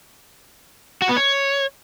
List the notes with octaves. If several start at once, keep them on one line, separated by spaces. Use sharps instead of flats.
F#4
B3
C#5